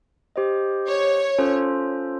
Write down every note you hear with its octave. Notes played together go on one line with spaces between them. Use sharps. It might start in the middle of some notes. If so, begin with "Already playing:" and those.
G4 C5 D#5
C#5
C#4 F4 A4 C5